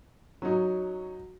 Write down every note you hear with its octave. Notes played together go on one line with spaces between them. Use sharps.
F#3 C#4 D#4